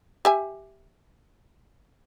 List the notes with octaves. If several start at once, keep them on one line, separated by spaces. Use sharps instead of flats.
G4 E5 G#5